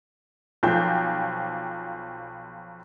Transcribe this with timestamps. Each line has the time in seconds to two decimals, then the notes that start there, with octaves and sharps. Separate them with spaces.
0.63 B1 F3 G5 G6